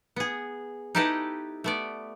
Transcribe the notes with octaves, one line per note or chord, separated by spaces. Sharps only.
B3 G#4
D#4 E4 G4 A4 B4 D#5
A3 B3 D5